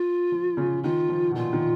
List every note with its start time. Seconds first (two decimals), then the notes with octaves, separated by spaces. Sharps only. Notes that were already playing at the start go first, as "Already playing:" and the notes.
Already playing: F4
0.32 F3
0.57 C#3
0.83 D#3 F4
1.09 F3
1.31 B2
1.35 A#2 F4
1.53 D#3